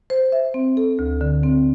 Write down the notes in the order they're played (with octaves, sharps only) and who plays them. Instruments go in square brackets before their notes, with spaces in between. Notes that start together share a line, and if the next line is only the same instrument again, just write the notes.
[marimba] C5
E5
C4
A4
D2
D3
C4